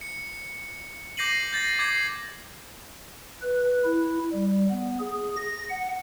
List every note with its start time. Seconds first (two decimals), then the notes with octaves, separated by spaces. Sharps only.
0.01 C#7
1.17 D6 G6 A#6 C7 D#7 F#7
1.53 G6 A6 A#6
1.79 D6 G#6 A#6 C7
3.41 B4
3.85 E4
4.33 G3
4.70 B3
4.99 G#4
5.36 A#6
5.70 F#5